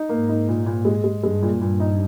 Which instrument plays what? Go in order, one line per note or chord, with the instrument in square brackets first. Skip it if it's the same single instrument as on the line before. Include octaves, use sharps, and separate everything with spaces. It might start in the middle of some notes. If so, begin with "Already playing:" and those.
Already playing: [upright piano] D#4
[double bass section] G#2 [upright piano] A#3
[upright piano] D#4
A#2
A#2
G#3
G#3
[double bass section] G2 [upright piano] G#3
[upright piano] A#2
[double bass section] G2 [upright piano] A#2
[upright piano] D#4